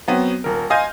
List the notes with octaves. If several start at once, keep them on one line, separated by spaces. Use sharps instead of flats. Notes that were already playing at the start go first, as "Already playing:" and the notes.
F#3 B3 C4
D#1 A#4
D#5 F5 G#5 C6 F6 G6